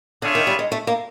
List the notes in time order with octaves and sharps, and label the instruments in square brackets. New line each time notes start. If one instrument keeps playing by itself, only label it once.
[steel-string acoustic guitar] D3 [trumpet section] D4 F4 G#4 C#5 E5
[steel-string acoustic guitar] D#3
G3
G#3
A3
A#3